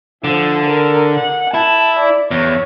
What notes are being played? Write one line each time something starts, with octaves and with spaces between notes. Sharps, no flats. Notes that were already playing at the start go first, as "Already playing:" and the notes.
D3 F3
A#4
F#5
E4 A5
D5
E2 C#5